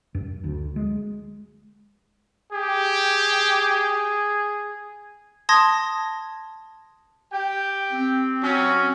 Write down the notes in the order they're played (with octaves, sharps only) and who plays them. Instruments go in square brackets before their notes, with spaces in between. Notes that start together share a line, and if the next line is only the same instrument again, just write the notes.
[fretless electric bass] F#2
D2
G#3
[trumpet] G4 [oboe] G#4
[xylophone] A5 C6 D#6 G#6 A#6
[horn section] G4 G5
[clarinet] C4
[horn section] F#3 C#4